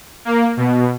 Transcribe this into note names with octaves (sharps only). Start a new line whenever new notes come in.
A#3
B2